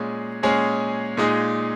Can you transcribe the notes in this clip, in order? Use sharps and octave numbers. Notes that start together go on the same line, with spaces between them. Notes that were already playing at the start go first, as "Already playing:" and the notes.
Already playing: A#2 G#3 C#4 G#4
A#2 G#3 C#4 G#4
A#2 G#3 D#4 G#4